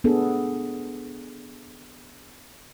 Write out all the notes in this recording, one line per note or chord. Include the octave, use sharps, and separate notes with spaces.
B3 D4 G#4 A4